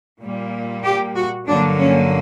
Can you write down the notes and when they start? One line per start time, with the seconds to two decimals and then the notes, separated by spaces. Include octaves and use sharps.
0.22 A#2 G3 A#3
0.84 G4
1.16 F#4
1.47 G2 D3 F#3 A#3 D4
1.79 C#4